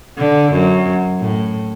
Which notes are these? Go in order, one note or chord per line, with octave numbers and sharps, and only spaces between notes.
D3
F#2
A2